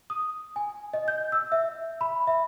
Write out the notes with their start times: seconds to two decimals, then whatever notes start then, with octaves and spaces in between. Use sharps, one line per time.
0.10 D#6
0.56 G#5
0.94 D#5
1.08 G6
1.32 E6
1.52 E5
2.01 B5
2.27 E5